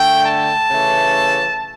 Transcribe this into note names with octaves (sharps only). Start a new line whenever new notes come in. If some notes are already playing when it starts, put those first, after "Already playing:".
Already playing: D3 A3 G5
A5
C#3 E3 A3